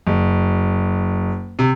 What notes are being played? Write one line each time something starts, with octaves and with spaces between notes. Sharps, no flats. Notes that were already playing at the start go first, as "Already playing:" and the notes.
F#1
C3